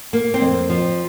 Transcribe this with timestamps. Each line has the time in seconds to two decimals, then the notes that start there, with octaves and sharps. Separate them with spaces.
0.13 A#3
0.34 C4
0.41 F2
0.70 F3